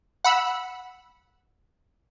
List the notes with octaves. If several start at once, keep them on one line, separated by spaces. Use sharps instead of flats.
F#5 B5 E6